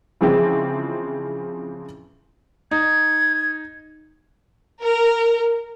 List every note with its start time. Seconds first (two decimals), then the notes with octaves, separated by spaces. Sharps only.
0.21 C#3 E3 F3 G#3 C4
2.71 D#4 G#6
4.80 A#4